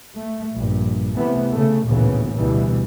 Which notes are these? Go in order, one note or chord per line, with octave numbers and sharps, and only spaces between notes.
A3
A#1 G2
C3 E3 A3 B3
C#3 A3
A1 D2 A#2 C#3 E3 B3
D2 B2 E3 G3